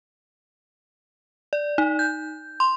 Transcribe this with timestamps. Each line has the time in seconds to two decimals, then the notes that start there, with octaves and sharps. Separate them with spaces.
1.53 D5
1.78 D#4
1.99 G6
2.60 C6